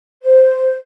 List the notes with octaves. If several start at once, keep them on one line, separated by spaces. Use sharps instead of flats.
C5